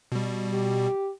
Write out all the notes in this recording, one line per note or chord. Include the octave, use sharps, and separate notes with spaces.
B2 G3
G4